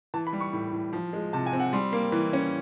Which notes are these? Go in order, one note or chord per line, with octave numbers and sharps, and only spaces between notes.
E3 A5
B5
G3
C#6
A2
A2
F3
G#3
C3 A5
G#5
C4
F#5
G3 C6
A#3
E3
C#4